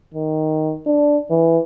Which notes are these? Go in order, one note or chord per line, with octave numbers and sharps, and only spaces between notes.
D#3
D4
E3